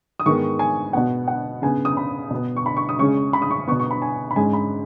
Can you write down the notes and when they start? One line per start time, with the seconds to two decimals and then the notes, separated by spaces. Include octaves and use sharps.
0.20 D#6
0.26 G#2 D#3 G#3 B3 C#6
0.59 G#5
0.93 B2 B3 F#5
1.28 F#5
1.62 C#3 B3 G#5
1.85 D#6
1.97 B5
2.30 B2 B3
2.56 C#6
2.66 B5
2.76 C#6
2.89 D#6
2.99 C#3 G#3 C#4 C#6
3.33 B5
3.42 D#6
3.51 C#6
3.68 B3 C#6
3.72 B2
3.79 C#6
3.91 B5
4.02 G#5
4.31 B5
4.36 G#2 G#3 C#4 G#5
4.53 B5